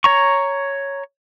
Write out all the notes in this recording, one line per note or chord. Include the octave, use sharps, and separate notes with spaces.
C#5 A#5 C#6